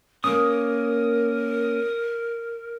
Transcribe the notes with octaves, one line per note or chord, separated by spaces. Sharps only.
A#3 C#4 A#4 D#6